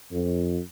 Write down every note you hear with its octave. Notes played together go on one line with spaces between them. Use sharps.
F2